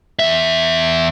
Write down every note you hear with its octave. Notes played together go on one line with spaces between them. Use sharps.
E2 E5